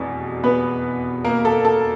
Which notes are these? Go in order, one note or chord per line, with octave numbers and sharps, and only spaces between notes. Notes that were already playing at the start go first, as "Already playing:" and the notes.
Already playing: F1 E2 B2
B3 B4
A#3 A#4
A4
A4